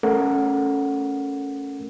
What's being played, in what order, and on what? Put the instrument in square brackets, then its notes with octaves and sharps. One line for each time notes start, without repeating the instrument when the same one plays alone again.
[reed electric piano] A3 C#4 A4 A#4 F#5